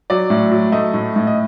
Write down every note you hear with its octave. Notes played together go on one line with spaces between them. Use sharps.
F#3 D5
A2
F#3
A3 D#5
A2
A2
D#5